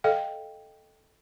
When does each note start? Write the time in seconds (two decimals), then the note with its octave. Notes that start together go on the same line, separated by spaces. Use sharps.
0.04 A4 D#5 F5 G5